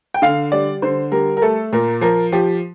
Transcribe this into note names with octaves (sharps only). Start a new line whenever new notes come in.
G5
D3 F5
G3 D5
D3 C5
G3 A#4
A#4
A3 A4
A#2 A#4
F3 A#4
F3 G4